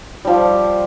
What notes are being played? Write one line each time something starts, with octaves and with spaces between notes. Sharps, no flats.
F3 G3